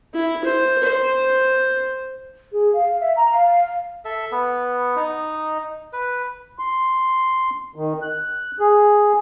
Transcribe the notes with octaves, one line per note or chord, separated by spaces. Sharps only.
E4
C5
C5
G#4
F5
E5
A#5
F5
A4 E5
B3
D#4
B4
C6
D#3
F#6
G#4